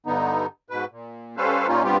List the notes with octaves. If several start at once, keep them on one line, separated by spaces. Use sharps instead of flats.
G2 D3 B3 D#4
G#2 B2 B4
A#2
G3 C#4 A4 B4 C5 F5
A#2 G3 A#3 C#4 D#4 F4
G2 G3 B3 C4 F4 G4